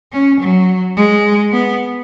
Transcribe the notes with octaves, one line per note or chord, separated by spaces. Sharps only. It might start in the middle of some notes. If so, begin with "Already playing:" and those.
C#4
F#3
G#3
B3